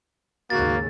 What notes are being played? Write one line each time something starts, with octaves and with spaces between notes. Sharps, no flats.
D#2 G#2 C#3 A#3 F#4 A6